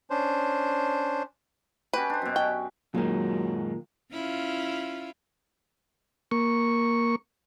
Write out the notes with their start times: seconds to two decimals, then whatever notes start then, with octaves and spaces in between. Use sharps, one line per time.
0.10 C#4 D4 C5
1.93 C#4 F#4 G4 B4
2.10 D4 C5
2.22 F#2 B2
2.36 C#4 G5
2.95 F#2 A#2 D#3 F#3 G#3
4.12 C#4 E4 F4
6.31 A#3 C#6